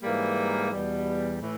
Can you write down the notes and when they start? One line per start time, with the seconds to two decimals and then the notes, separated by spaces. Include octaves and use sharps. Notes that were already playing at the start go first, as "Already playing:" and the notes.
0.03 G#2 E3 G3 A#3
0.71 E2 B2 G3
1.39 A2 E3